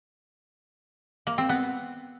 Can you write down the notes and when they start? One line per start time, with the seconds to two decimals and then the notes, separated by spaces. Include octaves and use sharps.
1.27 A#3
1.38 C4
1.49 B3